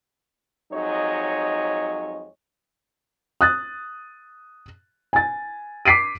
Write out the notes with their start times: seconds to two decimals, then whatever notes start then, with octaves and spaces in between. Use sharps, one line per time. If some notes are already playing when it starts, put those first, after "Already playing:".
0.72 F2 F#3 G#3 D#4 C#5 D#5
3.41 D#6 F#6 A6
5.13 G#5 A6
5.85 D6 B6 C7 D7 D#7